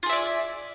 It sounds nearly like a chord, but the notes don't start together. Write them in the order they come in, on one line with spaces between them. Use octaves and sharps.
F4 G#4 E5 D5